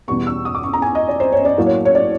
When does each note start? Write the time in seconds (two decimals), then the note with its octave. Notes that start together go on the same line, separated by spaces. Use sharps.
0.08 E2 B2 G3 B3 C#6
0.27 E6
0.45 D#6
0.54 D6
0.64 C#6
0.73 A#5
0.82 G#5
0.95 D#5
1.08 D5
1.20 C5
1.32 C#5
1.45 D5
1.58 A2 F#3 A#3
1.67 C#5
1.85 C#5
1.95 D5